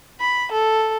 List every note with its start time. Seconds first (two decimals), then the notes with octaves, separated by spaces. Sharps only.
0.20 B5
0.52 A4